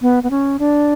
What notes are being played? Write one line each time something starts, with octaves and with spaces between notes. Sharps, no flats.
B3
B3
C#4
D4